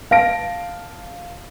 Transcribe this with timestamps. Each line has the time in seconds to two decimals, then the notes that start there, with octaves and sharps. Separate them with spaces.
0.11 F5 A5 A#6 D7